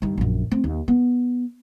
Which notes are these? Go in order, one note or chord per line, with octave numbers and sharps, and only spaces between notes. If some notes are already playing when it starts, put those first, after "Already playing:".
G2 D#3
A#1 F#2
A3 C4
D#2
B3